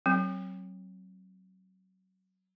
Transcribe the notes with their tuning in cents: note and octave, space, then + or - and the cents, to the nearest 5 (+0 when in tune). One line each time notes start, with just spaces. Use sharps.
F#3 +20 C4 +25